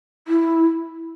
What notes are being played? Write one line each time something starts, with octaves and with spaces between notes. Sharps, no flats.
E4